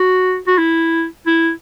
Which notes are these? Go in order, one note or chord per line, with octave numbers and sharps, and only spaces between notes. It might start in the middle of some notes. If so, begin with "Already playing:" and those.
Already playing: F#4
F#4
E4
E4